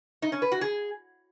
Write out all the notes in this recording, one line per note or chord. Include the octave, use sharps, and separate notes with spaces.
D#4
C#4
B4
F#4
G#4